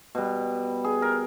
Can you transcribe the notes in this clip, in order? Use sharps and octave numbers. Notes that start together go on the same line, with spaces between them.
B2 G3
G#4
A#4